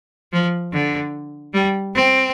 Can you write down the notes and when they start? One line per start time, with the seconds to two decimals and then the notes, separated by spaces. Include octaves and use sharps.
0.32 F3
0.73 D3
1.53 G3
1.95 C4